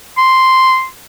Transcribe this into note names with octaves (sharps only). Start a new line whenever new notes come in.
C6